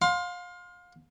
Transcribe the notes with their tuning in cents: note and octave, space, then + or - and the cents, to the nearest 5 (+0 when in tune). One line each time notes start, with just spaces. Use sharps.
F5 +30 C6 +0